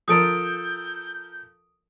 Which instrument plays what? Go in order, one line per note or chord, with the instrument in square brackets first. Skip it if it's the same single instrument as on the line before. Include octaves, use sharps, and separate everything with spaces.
[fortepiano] F3 A4 A#4 [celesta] D#6 D7 [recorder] G6